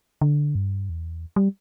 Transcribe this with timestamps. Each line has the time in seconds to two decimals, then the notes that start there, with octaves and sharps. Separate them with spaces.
0.21 D3
0.55 G2
0.90 E2
1.36 G3